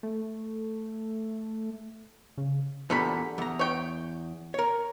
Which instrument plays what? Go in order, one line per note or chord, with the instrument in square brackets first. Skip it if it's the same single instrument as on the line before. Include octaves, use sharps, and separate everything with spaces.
[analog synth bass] A3
C#3
[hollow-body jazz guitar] E2 A#2 [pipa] D3 G3 B5
[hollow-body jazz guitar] E2 A#5
[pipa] C#5 G5
[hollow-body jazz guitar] A#4 C#5